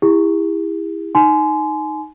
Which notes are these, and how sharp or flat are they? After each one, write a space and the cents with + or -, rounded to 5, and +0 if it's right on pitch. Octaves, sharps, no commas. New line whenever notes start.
E4 +0 G4 +45
D#4 +0 G#5 +30 C6 -20